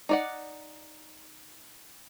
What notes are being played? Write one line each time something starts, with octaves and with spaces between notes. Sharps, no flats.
D#4 D5 F#5